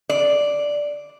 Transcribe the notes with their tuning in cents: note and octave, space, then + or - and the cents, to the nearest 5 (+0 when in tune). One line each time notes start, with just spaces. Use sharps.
D5 +0